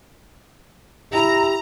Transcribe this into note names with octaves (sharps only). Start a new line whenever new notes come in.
E4 G4 A#5